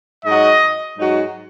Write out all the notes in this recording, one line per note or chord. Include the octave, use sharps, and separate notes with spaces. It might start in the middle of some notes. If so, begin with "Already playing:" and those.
G#2 F#3 D#4 F#4 D#5
G#2 F#3 D#4 F#4